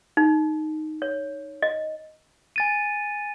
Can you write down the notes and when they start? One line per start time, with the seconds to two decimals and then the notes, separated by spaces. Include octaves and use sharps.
0.17 D#4
1.02 C#5
1.62 D#5
2.56 G#5 A6 D#7